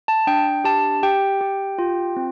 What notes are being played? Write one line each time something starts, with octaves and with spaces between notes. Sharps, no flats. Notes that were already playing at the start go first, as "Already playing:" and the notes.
A5
D4 G5
G4 A5
G4 G5
G4
F4
C4